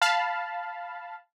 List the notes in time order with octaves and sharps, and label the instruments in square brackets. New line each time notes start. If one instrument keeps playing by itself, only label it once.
[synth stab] F5 A5 B5